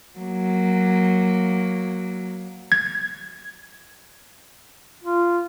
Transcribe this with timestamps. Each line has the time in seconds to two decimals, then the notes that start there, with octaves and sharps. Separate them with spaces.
0.18 F#3 A#3
2.72 G#6
5.04 F4